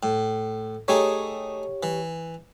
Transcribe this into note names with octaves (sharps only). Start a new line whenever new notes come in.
A2
A3 D#4 G4 G#4 C#5
E3